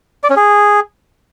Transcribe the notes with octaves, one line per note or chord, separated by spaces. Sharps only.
D5
C#4
G#4